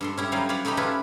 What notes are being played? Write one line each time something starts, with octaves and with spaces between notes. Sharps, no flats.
G2 A4 C6
C#4 E4 G4
F#3 G3 D#4 F4 F5
B4 C#5 D5 F5 F#5 B5
A3 D#4 F#4 G4 B5
C#4 E4 F4 G4 A4 B4